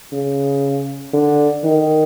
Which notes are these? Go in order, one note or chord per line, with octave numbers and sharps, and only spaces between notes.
C#3
D3
D#3